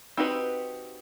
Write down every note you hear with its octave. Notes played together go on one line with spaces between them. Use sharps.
C4 D#4 F#4 G4 B4